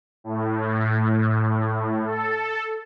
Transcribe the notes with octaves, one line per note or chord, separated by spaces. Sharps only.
A2
A4